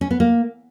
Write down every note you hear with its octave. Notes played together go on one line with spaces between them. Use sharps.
C#4
B3
A#3